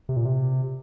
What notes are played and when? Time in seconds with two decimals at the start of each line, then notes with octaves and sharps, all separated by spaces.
0.09 C3
0.17 A#2
0.25 C3